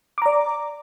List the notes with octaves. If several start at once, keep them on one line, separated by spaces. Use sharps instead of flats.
D5 A#5 D6